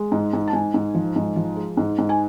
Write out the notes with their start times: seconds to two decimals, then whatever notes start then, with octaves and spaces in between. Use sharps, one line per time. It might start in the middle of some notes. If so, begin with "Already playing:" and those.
Already playing: G#3
0.12 G#2
0.33 G#2
0.48 A5
0.53 G#2 G#5
0.74 G#2
0.94 F3
1.16 G#2
1.36 F3
1.56 G#3
1.77 G#2
1.98 G#2
2.09 G#5